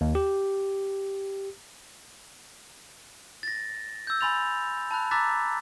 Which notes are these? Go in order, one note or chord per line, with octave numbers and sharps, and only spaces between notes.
D#2
G4
A6 A#6
E6 G6
G#5 B5 C6 A6 F7
A5 B5 F#6
A#5 D6 E6 F#6 A6 B6